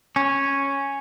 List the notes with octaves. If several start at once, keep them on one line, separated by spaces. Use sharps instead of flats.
C#4